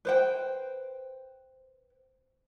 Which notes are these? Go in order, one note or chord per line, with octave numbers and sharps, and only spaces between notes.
B4 C5 G5